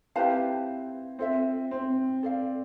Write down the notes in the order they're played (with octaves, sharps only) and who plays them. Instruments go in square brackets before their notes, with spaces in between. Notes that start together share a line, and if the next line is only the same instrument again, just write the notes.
[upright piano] C4 E4 [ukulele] G4 B4 F5 A5
[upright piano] C4 [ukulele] F4 A4 E5
[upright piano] C4
[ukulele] A4 D5 F5